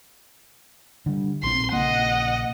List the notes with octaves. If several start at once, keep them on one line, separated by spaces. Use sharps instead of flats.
D3 G3
A#1 C4 C6
A#1 C#3 A#3 D#5 F#5